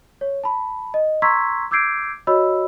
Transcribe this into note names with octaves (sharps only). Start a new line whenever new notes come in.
C#5
A5 B5
D#5
A#5 C6 C#6 E6 G#6 B6
D6 E6 G6 G#6 C7 D7
F#4 C#5 D#5 B5 E6